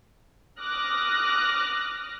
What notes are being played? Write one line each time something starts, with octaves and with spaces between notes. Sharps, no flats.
D6 D#6 F6 F#6 A#6